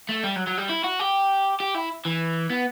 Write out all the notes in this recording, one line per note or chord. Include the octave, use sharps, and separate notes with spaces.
A3
G3
F#3
F#3
G3
E4
F#4
G4
G4
E4
E3
B3